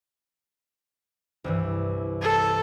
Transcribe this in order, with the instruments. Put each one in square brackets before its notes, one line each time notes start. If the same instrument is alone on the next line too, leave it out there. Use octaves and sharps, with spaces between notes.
[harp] C2 G2 E3
[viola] A4